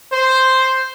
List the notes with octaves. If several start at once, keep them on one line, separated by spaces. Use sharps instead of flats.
C5